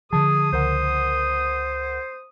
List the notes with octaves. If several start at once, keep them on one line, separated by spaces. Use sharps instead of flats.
D3 F3 G#4 A5 D#6
C#2 A#4 C5 F#5